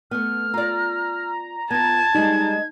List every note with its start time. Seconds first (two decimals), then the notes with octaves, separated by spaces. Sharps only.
0.11 A3 B3 F6
0.54 F4 D5 A#5
1.71 B3 F4 A5 G#6
2.15 G3 G#3 D#4